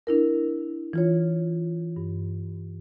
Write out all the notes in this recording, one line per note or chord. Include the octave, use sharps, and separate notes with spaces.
D4 E4 A#4
E3 F4 C#5
G2